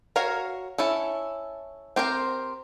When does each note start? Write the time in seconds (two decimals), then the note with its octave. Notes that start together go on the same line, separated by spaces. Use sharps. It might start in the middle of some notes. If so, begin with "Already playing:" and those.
0.16 F#4 A#4 C#5 F5 A#5
0.78 C#4 E4 A4
1.96 C4 G4 A#4 C5